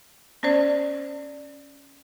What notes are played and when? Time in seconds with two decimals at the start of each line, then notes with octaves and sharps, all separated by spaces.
0.43 B3 C#4 C5 D5